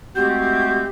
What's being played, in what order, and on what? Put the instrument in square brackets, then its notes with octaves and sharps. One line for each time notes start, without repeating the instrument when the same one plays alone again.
[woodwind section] G#3 A3 C4 [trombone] F#4 [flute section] G4 [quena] G6